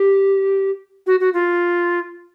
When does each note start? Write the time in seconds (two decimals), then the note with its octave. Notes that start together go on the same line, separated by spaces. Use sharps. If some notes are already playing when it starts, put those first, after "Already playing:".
Already playing: G4
1.07 F#4
1.20 F#4
1.34 F4